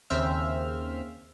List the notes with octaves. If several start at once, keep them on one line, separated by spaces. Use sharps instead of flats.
D#2 C#3 C4 C5 E5 F6